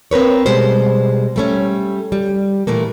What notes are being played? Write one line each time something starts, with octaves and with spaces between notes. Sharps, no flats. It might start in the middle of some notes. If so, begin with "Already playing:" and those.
C4 A#4 B4 C#5
B2 G3 G#3 C5
G3 A3 C#4
G3
A#2 E3 A3 A#3